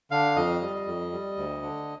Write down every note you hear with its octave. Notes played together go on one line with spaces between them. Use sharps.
D3 F5
F2 D#5
G3
F2
G3
D2
D3